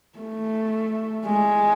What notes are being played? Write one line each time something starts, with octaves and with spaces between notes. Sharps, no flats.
A3
G#3